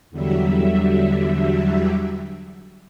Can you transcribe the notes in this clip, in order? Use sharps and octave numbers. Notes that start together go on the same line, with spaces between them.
E2 D3 F#3 G3 E5